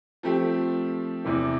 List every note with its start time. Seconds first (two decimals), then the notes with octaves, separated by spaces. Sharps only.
0.23 F3 A3 C4 G4
1.25 E2 C3 E3